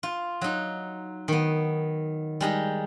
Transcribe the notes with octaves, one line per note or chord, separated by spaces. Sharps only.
F4
F#3 D#4
D#3 B3
G3 G#3 D#4